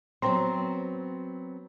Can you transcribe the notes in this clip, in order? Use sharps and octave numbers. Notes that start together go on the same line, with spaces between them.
F#3 B3 C4 C5 A#5 C6